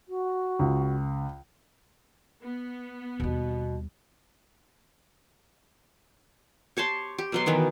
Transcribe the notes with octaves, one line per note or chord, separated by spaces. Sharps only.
F#4
C#2
B3
D#2 B2 G3
G4 C#5 A5 C6
G4
B2 F#3 C6
D#3 E3 B3